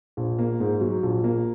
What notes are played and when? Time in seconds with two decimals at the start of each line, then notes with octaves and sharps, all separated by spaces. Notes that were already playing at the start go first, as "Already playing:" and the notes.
0.17 A#1
0.39 A#3
0.60 G#2
0.81 F#3
1.03 A#1
1.24 A#3